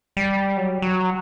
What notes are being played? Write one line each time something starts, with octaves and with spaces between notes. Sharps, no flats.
G3
F#3
F#3